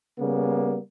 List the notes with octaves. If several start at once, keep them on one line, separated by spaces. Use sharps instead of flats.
C#3 G3 A#3 B3